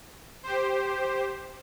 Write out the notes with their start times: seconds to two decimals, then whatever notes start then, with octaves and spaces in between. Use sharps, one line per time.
0.43 G4 C5